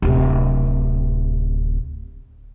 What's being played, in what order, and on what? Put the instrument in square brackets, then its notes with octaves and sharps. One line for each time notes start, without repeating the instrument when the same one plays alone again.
[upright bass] D1 C3